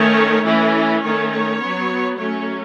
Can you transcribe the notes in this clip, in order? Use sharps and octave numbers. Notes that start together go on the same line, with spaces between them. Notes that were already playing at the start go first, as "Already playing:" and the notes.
Already playing: D#3 A3 C#4 C#5
E3 A3 C#4 E4
E4
D#3 A3 C#4 C#5
C#5
F#3 B3
F#3 A3 C#4 C#5